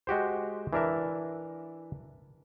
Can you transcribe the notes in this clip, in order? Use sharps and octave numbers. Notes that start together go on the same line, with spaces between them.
G#3 F#4 G4 C5
E3 D4 A#4 E5